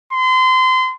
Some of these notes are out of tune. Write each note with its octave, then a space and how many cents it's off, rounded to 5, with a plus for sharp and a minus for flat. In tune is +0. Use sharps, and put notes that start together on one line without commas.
C6 -30